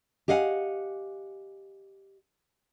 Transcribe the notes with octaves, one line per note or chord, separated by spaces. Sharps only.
G4 D#5 F5 F#5 G#5